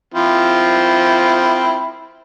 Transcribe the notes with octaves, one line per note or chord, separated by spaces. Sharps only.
F3 C4 E4